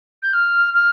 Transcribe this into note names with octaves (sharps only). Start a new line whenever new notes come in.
G6
F6
F6